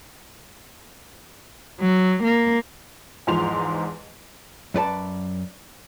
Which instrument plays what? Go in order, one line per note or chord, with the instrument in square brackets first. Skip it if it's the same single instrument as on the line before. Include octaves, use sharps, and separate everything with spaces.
[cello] F#3
A#3
[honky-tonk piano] E2 G#2 F3 C6 F7
[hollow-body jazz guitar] F#2 B4 D5 A5